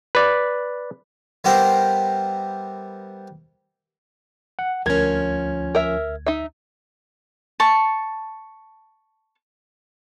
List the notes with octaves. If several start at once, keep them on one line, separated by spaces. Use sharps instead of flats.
B4 D5
G3 B3 E4 G4 A#4 C5
F#5
D2 F3 C#4 A#4 G#6
A#4 E5
D#4 E5
A5 C#6